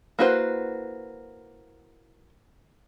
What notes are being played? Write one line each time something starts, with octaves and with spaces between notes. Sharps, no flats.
A#3 E4 F#4 B4 C5